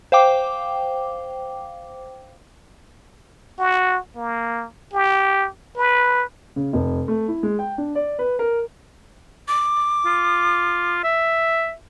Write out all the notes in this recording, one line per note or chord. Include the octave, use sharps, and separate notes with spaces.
C5 F5 G5 D6
F#4
A#3
G4
B4
C#3
F1
A3
E4
G#3
G5
D4
D5
B4
A#4
D6
F4
E5